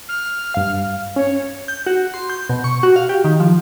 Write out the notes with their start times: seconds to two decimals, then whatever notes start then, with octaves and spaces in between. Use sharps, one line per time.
0.09 F6
0.54 G2 F5
1.16 C#4 C#5
1.68 G6
1.87 F#4
2.14 C6
2.30 G6
2.50 B2
2.64 C#6
2.83 F#4
2.96 F5
3.09 G4
3.24 D#3
3.40 F3